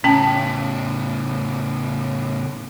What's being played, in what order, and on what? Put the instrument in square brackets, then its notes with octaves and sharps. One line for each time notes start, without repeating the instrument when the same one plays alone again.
[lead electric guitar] A2 C#3 [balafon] C#4 G5 A5